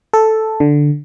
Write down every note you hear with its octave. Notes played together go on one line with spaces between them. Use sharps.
A4
D3